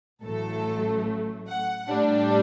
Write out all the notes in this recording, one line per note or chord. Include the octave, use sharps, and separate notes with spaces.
A1 A2 F#3 A3 A4
F#5
A2 G3 D4